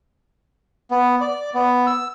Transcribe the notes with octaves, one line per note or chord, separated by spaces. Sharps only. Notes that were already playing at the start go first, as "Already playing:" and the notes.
B3
D5
B3
E6